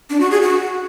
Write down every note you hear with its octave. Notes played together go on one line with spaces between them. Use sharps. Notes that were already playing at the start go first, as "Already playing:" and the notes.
D4
F#4
G#4
F#4